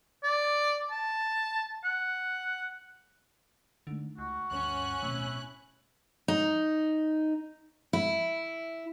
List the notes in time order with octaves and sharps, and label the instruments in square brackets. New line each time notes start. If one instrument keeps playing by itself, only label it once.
[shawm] D5
A5
F#5
[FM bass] D3 [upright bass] A3 D#4
[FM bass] C#2 [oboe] F#4
[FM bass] D2 [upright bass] G2 [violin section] C#4 F#6
[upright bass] D1 B2 [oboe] E4
[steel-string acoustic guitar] D#4
E4